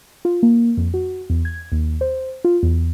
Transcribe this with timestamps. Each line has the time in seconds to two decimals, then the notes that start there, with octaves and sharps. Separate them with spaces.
0.25 F4
0.43 A#3
0.77 F2
0.94 F#4
1.30 E2
1.45 G#6
1.72 D#2
2.01 C5
2.44 F4
2.63 E2